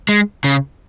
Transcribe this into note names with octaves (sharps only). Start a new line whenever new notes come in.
G#3
C#3